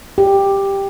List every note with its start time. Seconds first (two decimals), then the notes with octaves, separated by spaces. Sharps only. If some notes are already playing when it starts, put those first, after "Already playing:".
0.18 G4